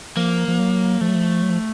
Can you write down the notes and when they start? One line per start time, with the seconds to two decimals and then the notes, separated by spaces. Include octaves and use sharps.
0.16 F3 A#3
0.48 F3
0.59 F#3
1.01 F3 A3
1.08 F#3
1.15 F3
1.43 F#3
1.50 F3